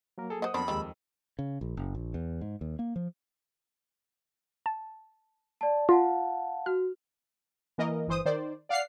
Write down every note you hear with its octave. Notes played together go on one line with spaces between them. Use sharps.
F#3 A#3 A#4
G#4 A4
C5 D#5 F#5 D#6
F2 B3 D4 C5 B5
D#2 D#3 G3 G#3 E6
C#3
A#1
F#1
A#1
E2
G#2
D#2
A#3
F3
A5
D5 A5
F4 F5 F#5 A5
F#4 F6
E3 A#3 A#4 D#5
G1 E3 C5 D#6
D#3 C5 D5
D5 F5 F#5 F6 C7